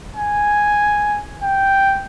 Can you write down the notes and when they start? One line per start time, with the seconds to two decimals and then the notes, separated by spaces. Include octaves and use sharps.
0.16 G#5
1.43 G5